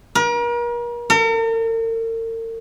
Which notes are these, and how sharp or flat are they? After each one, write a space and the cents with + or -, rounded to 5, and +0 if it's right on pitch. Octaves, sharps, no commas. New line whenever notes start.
A#4 +40
A#4 -45